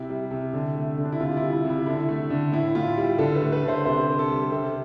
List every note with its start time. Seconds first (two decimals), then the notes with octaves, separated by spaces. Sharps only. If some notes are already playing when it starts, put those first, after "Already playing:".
Already playing: C3 E4
0.10 G3
0.31 C3
0.53 D3
0.75 A3
0.98 D3
1.05 D4
1.12 E4
1.20 C3 F4
1.37 E4
1.42 G3
1.53 E4
1.65 C3
1.70 E4
1.86 D3 E4
2.08 A3
2.30 D3
2.52 A2 E4
2.75 A2 F4
2.97 G3 G4
3.19 D3 A4
3.35 B4
3.41 A3
3.52 B4
3.63 D3
3.68 C5
3.85 C3 C5
4.07 C3
4.19 A4
4.30 G3
4.52 C3 A4